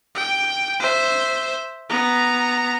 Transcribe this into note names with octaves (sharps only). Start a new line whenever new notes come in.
G5
C5 E5
B3 A#5